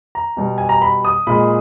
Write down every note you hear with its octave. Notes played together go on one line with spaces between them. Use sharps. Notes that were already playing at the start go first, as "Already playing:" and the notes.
A#5
B2 G3
G#5
A#5
B5
D#6
A#2 G#3 B5